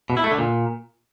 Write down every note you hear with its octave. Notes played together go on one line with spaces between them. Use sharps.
B2
E4
A3
D3
A#2